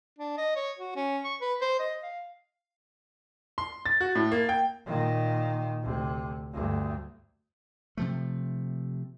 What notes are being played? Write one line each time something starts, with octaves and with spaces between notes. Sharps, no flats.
D4
D#5
C#5
F#4
C#4
C#6
B4
C5
D#5
F5
C6
A6
F#4
A2
A#3
G5
A#2 D#3
D2 C3
D2 G2
C3 F3 A3